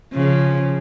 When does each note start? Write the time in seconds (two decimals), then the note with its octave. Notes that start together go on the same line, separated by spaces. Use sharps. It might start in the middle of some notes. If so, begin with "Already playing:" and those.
0.13 C#3 F3